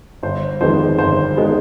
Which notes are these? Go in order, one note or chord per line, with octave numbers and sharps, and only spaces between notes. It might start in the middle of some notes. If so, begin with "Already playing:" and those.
G1 C5
F2 D#3 G#3 B3 C5
G1 C5
D#3 G#3 B3